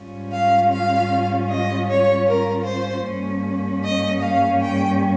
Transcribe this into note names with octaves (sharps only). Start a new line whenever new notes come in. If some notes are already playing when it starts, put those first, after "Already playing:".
Already playing: G#2 G3 C#4 F4
F5
F5
D#5
C#5
A#4
C5
G2 G3 A#3 C#4
D#5
F5
G5